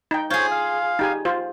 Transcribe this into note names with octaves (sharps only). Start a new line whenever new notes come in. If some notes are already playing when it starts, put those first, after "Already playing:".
D#4 G5
F4 G#4 C5 C#5
F5
D#4 G4 G#5
F4 C5